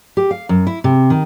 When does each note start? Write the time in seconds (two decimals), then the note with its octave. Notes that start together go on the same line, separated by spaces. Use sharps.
0.17 G4
0.31 F5
0.49 F#2
0.67 E4
0.84 C3
1.10 D#3